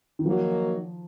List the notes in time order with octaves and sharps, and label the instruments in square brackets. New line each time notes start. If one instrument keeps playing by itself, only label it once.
[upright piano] D#3
[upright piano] F3 [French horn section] F#3 A#3 D#4 F#4